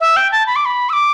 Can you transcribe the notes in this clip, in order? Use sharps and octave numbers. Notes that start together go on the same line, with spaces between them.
E5
G5
A5
B5
D6
B5
E6
D6